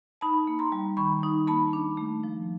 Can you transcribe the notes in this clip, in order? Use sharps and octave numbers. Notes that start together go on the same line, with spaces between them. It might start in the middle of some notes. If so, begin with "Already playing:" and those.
D#4 A5 B5
A#3
A#5 C6
G3
D#3 B5 C#6
D#4
A#3 A5 B5
D4
A3
F3